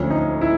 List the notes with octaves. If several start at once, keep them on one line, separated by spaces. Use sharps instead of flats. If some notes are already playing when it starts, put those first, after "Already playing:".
Already playing: D2 D3 F3 C#4
D#4
E4